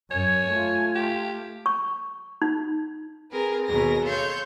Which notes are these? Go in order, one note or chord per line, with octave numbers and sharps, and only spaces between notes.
F#2 C#5 G#5
A3 F4
G4
C#6
D#4
C4 G#4 A#4 B4
D#2 B2 G#4 A#4 A#6
A4 C#5 F5 C6 G6